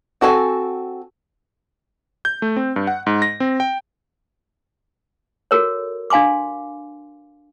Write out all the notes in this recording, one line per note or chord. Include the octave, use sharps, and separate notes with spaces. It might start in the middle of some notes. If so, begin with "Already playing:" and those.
C4 F#4 A4 D5 G#5
G6
A3
C4
G2
F#5
G#2
A#6
C4
G5
F#4 A4 A#4 C#5
D4 F5 G#5 C6 D6